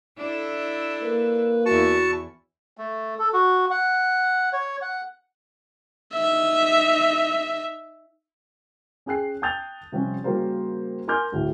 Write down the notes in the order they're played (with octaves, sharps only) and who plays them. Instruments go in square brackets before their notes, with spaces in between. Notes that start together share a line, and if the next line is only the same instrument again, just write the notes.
[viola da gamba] D4 E4 A4
[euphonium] A#3 [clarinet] B4
[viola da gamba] E2 E4 [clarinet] F#4 [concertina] A5 C#6
[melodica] A3
A4
F#4
F#5
C#5
F#5
[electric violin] D#4 E5
[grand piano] C#4 G#4 G5 F#6 C7
G5 A5 D#6 G6 A6 F7
C3 F3 G3 C4 C#4
C#3 G3 A#3 F#4 A#4 C5
A#4 G#5 C6 D6 F6 G6
D1 A2